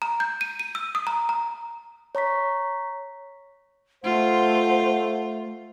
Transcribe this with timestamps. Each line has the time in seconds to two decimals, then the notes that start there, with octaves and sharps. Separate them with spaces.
0.02 A#5
0.20 G6
0.41 D#7
0.59 D#7
0.75 E6
0.95 D#6
1.07 A#5
1.29 A#5
2.15 C#5 A#5 C#6 B6
4.04 A3 F4 C5 F#5